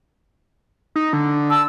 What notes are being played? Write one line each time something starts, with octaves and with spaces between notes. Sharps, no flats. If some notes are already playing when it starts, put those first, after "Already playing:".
D#4
D3
A5 E6